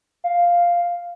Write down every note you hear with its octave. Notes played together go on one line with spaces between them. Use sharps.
F5